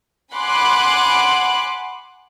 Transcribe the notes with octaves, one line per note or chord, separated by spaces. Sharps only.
F#5 G#5 B5 C6 D6 F#6